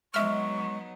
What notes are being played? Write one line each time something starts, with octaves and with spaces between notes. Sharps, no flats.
F#3 G#3 B3 D#4 E5 C#6 F6